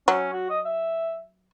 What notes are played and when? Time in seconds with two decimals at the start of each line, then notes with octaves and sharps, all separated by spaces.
0.08 F#3 C#4
0.32 F#4
0.50 D#5
0.65 E5